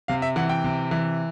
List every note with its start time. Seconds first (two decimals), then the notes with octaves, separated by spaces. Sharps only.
0.08 C3 F5
0.22 E5
0.36 E3 F#5
0.49 G5
0.64 C3
0.91 E3